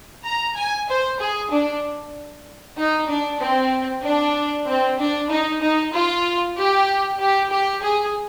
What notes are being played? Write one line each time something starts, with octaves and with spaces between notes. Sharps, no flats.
A#5
G#5
C5
G#4
D4
D#4
D4
C4
D4
C4
D4
D#4
D#4
F4
G4
G4
G4
G#4